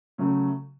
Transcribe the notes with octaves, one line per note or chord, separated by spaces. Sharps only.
C#3 F#3 A3